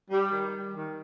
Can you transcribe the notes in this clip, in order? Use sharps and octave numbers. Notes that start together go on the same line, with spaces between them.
G3
D#3
G3
D#3